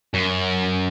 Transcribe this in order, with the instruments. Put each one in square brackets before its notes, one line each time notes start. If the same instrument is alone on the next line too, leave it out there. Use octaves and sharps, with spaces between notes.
[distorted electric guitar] F#2